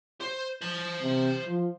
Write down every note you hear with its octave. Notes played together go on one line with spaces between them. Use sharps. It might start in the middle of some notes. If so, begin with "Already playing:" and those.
C5
C5 A5
C3
F3